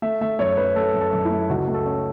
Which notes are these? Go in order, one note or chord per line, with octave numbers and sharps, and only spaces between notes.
A3 E5
A3 E5
F#2 C#5
F#2 B4
A3 A4
F#2
A4
F#2
E4
A3
C#2 F#4
A3
A4
C#4